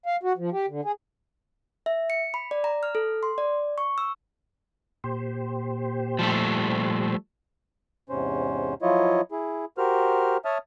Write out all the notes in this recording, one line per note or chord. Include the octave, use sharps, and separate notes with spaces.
F5
F#4
F3
G4
D3
G#4
E5
C#7
B5
D5
A#5
F6
A4
C6
D5
C#6
E6
A#2 G4 C5
F3 G3 A3
E2 G#2 C3 C#4 C5
F3 F#3 E4 F4 C#5 D#5
E4 G#4
F#4 G4 A#4 C5 F6
C#5 E5 A5 D#6 F6